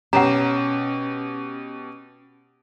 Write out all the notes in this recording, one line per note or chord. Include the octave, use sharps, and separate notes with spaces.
B2 C#4 G4 F#5 A#5